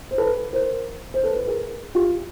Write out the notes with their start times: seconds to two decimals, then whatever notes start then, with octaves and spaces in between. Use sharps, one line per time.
0.11 C5
0.18 A4 B4
0.53 A#4 C5
1.14 C5
1.24 A4 B4
1.36 B4
1.47 G#4 A#4
1.95 F4 G4